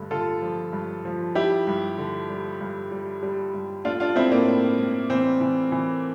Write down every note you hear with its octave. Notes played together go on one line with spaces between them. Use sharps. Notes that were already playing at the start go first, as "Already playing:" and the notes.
Already playing: G2 D3 A3
D3 F4 A4
F3
G2
F3
G3 E4 G4
G2
D3
G3
G2
G3
G3
G2
A3 D4 F4
D4 F4
A2 C4 E4
A#3 D4
A2
A2
E3 C4
E3
E3